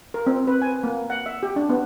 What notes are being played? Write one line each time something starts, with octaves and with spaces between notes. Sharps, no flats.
A#4
C4
B4
G#5
A#3
F#5
E5
G4
D4
B3